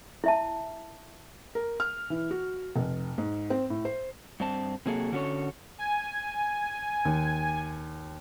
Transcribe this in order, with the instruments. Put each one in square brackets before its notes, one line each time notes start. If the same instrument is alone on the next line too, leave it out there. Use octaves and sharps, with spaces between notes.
[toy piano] E4 E5 A5
[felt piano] A#4
F6
E3
F#4
F1
G#2
C4
A2
C5
[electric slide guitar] G2 C4 A5
C3 F#3 A#3 G#4 A4
D3 C#4 F#4 G4 A4 C#5
[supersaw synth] G#5
[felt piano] D#2